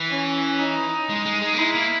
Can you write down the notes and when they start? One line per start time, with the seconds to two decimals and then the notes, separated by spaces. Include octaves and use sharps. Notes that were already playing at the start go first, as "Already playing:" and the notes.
Already playing: E3
0.10 C#4
0.59 D#4
1.09 G#3
1.26 G#3
1.42 G#3
1.54 A#3
1.58 G#3 E4
1.75 A#3